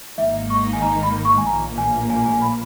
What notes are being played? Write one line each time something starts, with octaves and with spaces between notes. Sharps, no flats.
G#1 G#2 D#3 A#3 D#4 E5
C#6
G#5
A#5
B5
C#6
G#5
A#1 A#2 A#3 A#5
G#5
G#5
G#5
B5